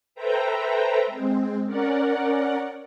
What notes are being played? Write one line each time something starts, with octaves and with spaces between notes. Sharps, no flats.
A4 B4 C5 E5 G5 A#5
G#3 C4
C#4 A#4 D5 F#5